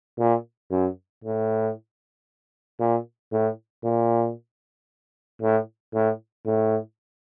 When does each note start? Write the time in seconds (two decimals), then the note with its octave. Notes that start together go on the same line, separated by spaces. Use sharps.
0.19 A#2
0.71 F#2
1.24 A2
2.80 A#2
3.32 A2
3.85 A#2
5.42 A2
5.94 A2
6.46 A2